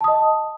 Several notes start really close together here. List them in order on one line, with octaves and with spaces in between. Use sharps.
A5 D#6 D#5